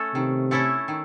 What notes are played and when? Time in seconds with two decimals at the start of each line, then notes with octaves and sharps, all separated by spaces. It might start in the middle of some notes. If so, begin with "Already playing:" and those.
Already playing: A3 C#4 A4
0.14 C3 D#3
0.51 A3 C#4 E4 A4
0.88 D#3